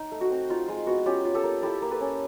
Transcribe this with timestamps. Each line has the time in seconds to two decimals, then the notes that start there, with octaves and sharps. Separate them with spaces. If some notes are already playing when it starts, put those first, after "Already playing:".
Already playing: D#4
0.12 A3
0.21 F#4
0.31 C4
0.50 D#4 F4
0.68 G#3 F4
0.87 B3 F#4
1.06 C#4 F4 G4
1.25 F4
1.34 G4 A4
1.43 A#3
1.62 E4 G4 A4
1.82 A#3
1.91 A4 B4
2.01 C#4